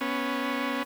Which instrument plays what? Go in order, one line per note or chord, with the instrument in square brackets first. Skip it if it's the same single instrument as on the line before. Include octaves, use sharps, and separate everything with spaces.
[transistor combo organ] B3 C#4